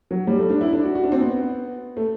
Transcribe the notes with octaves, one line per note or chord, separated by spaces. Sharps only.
F#3
G3
A3
D4
E4
D4
F#4
F#4
D4
C4
B3
A3